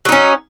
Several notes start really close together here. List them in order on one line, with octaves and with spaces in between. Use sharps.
F#3 D#4 C#4